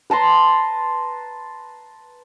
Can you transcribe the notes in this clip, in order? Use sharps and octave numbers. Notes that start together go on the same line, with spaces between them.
B4 A5 A#5 C6